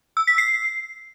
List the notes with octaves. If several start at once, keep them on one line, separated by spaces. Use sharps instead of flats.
E6
B6
C7